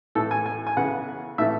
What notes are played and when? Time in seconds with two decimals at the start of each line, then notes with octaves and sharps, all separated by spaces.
0.15 A2 E3 A3 A4
0.31 G#5
0.46 G#5
0.67 G#5
0.77 C#3 E3 B3 F#5
1.38 A2 E3 A3 E5